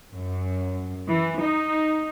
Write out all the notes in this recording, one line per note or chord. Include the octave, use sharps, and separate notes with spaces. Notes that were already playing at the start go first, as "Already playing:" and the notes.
F#2
E3
D#4